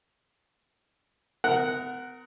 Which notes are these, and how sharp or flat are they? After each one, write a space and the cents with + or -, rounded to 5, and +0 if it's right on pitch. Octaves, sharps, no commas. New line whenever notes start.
B3 +40 A#4 -10 F#5 +0